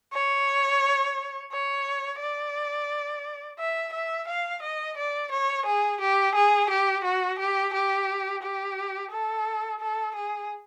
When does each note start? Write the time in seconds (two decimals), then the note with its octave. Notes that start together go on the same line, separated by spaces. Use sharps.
0.13 C#5
1.52 C#5
2.20 D5
3.59 E5
3.93 E5
4.28 F5
4.63 D#5
4.98 D5
5.32 C#5
5.66 G#4
6.01 G4
6.35 G#4
6.70 G4
7.04 F#4
7.39 G4
7.73 G4
8.42 G4
9.12 A4
9.80 A4
10.15 G#4